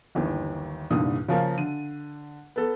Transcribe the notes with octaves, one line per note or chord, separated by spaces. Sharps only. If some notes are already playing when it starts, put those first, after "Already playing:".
G1 D#2 D#3 E3
C2 G2 A#2 D3 D#3 D#6
C#3 F3 A#3
D3 D#7
B3 A4